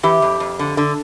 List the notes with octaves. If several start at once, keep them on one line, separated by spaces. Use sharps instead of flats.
E3 G4
F2
F2
D3
D3